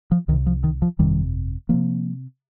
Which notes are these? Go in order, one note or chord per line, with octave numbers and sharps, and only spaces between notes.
F3
C2 C3 D#3
F3
D#3
F3
G1 F2 C3 D#3 G3
C3 F3 A#3